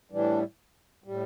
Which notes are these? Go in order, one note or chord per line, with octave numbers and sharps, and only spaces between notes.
A2 E3 G3 D4
A2 G3